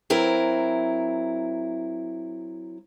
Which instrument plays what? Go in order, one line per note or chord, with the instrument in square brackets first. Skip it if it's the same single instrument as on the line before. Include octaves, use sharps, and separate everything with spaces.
[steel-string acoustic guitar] F#3 C4 E4 A#4